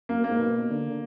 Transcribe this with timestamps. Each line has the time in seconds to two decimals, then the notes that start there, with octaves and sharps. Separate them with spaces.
0.09 F#2 A#3
0.20 F#2
0.24 A#3
0.29 G#2
0.39 B2
0.70 D3
0.89 D3